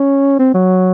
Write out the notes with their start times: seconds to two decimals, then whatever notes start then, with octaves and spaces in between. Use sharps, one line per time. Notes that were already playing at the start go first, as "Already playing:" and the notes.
Already playing: C#4
0.39 C4
0.54 F#3